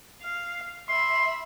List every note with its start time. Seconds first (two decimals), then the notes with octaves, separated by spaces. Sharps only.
0.22 F5
0.89 E5 B5 C6